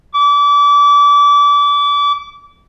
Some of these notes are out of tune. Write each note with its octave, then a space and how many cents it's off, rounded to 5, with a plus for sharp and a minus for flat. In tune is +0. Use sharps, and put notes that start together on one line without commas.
D6 -30